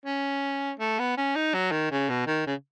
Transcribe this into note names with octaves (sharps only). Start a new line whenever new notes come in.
C#4
A3
B3
C#4
D#4
F#3
D#3
C#3
B2
D#3
C#3